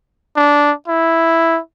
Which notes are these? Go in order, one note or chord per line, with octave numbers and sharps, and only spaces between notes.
D4
E4